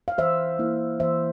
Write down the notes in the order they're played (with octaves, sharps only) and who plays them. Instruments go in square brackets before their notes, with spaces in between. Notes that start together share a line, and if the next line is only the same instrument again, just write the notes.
[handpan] F5
E3 C5 E5
A#3 E4
E3 C5 E5